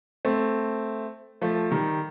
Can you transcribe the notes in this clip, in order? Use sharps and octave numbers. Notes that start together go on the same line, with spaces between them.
A3 C4
F3 A3
D#3 G3